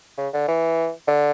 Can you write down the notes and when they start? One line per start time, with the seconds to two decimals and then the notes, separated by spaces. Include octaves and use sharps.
0.18 C#3
0.33 D3
0.48 E3
1.08 D3